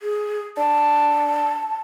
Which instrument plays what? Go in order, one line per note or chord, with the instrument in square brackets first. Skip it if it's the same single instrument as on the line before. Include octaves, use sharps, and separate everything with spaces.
[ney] G#4
[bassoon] D4 [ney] A5